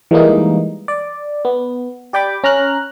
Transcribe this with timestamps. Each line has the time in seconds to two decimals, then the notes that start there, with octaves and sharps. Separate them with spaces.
0.11 E3 G3 G#3 A#3 D#4
0.88 D5
1.45 B3
2.13 G4 D5 G5 B5 D6
2.44 C#4 A#5 F6 F#6